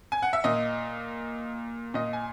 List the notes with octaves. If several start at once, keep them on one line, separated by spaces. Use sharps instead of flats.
G#5
F#5
E5
A#2 D#5
A#2 D#5
G#5